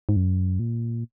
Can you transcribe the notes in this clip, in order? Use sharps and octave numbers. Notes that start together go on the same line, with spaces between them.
G#2
F#2
A#2